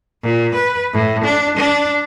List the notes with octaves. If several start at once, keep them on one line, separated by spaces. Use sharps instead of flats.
A#2
B4
A2
D4
D4